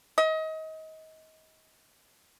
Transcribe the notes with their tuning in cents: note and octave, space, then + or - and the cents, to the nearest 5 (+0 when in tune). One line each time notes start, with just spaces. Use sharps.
D#5 +30